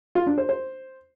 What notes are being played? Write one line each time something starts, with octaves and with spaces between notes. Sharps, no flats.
F4
D4
C5
C5